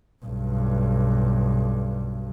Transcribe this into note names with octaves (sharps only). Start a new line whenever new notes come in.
B1 G2